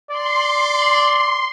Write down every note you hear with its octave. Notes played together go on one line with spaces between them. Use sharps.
D5 C6